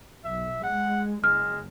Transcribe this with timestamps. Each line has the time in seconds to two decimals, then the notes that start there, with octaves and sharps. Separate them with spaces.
0.24 B1 E5
0.64 G#3 F#5
1.24 F#1 G#3 F6